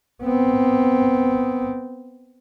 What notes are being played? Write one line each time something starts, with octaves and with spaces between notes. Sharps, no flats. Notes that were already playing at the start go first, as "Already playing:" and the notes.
B3 C4